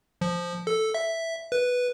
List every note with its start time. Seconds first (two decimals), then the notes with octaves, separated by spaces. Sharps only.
0.21 F3
0.67 A4
0.94 E5
1.52 B4